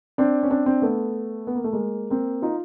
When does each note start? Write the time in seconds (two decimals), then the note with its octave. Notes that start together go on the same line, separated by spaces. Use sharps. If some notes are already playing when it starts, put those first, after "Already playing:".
0.18 C4 D4
0.43 C#4
0.50 C4 D4
0.66 C4 D4
0.82 A3 B3
1.47 B3
1.55 A#3
1.64 A3
1.73 G#3 A#3
2.10 A#3 C4
2.42 D#4 F4